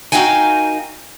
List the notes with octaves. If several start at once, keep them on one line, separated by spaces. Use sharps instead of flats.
D#4 F#4 A#4 F5 G5 G#5